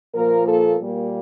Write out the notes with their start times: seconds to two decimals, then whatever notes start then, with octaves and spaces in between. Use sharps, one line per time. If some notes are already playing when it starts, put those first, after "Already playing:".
0.15 A#2 F3 A#3 A#4
0.47 A4
0.79 A#2 G3 A#3